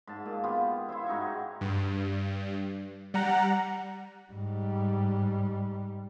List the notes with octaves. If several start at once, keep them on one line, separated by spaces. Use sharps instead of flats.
G#2 A5
A#2
G#3 B3 F4 G4
E4 F4 C5 E5
G#2 D#4 F#4 C#6
G2
G3 F#5 A#5
G#2 G3